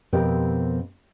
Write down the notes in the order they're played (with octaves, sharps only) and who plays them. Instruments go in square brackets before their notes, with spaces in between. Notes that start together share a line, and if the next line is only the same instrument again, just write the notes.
[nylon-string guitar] F2 B2 C4 G4 A#4 D#5